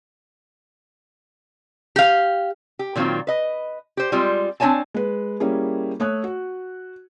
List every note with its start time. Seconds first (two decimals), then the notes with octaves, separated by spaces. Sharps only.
1.96 G4 F5
2.79 G4
2.96 A#2 D#3 F#3 A3 C4 F4
3.27 B4 D#5
3.97 G4 C5
4.12 G3 G#3 C4 F4
4.60 C4 D4 G4 C#5 G#5 A5
4.94 G#3 B4
5.40 G3 A#3 C#4 E4 G#4
6.00 A3 C#5 D#6 F#6
6.24 F#4